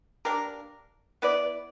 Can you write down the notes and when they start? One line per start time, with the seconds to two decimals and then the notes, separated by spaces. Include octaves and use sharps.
0.25 A#3 D4 G4 A#4
1.22 B3 E4 B4 D5